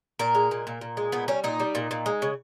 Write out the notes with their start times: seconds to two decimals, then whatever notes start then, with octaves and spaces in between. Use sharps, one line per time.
0.19 A#2 A#4
0.35 G#3
0.51 A#2
0.67 A#2
0.81 A#2
0.97 G#3
1.12 A#2 B3
1.28 G3 C#4
1.44 A#2 D#4
1.60 G3
1.75 A#2
1.91 A#2
2.06 G#3
2.22 C#3